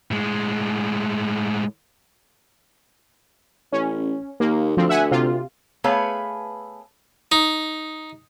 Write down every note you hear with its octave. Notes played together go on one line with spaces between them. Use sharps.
A2 G#3
A1 C#4
D#2 A#3
D2 F3 C4
E5 F#5 G#5
C3 F4
A3 B3 G#4 B4 C#5 F5
D#4